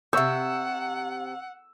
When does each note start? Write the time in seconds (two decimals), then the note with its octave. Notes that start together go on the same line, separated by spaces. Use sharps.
0.13 A2 C3 E5 F#5 C#6 E6 G6